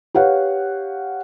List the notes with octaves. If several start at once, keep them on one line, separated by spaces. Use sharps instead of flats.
G4 B4 C#5 F5 F#5